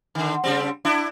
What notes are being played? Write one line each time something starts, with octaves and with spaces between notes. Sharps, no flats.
D3 D#3
C#3 G3 C4
D4 E4